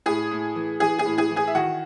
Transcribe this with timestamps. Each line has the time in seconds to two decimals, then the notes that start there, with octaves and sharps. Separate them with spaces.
0.06 A2 G#4 G#5
0.31 A2
0.56 E3
0.80 E3 G#4 G#5
0.99 G#4 G#5
1.06 A2
1.18 G#4 G#5
1.30 E3
1.36 G#4 G#5
1.47 E5
1.55 D#3 F#4 F#5